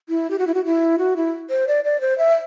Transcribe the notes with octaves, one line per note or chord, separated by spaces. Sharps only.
E4
G4
F#4
E4
F#4
E4
F#4
E4
C5
D5
D5
C5
E5